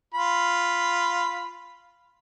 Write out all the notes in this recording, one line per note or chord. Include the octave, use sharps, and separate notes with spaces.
F4 B5